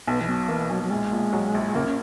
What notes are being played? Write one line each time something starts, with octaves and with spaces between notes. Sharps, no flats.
B1 B3
E3
B2 F#3
E3 A#3
B1 F#3
F#3
A#1 G#3
A#2
F#3
A#1
C#3 A#3
C#4